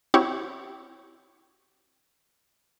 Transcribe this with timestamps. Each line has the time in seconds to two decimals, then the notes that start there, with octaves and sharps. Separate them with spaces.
0.14 C4 E4 F#4 G4 C#5